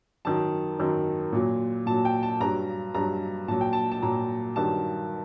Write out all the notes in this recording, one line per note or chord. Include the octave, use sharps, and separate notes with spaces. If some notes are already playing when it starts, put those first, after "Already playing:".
F#2 D#3 F#3 A5
F#2 D#3 F#3
A#2 F#3
A#2 F#3 A5
G5
A5
G2 F#3 A#5
G2 F#3 A#5
A#2 F#3 A5
G5
A5
A5
A#2 F#3 A#5
G2 D#3 F#3 A5